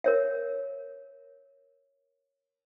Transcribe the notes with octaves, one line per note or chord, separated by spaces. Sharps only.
A#4 C#5 E5